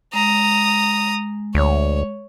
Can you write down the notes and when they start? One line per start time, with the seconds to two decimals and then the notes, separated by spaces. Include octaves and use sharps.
0.13 G#3 A#5 D#6
1.55 D2 C#5